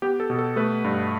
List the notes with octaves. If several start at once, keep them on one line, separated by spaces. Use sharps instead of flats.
B3 G4
A4
B2
A4
A3 B4
G2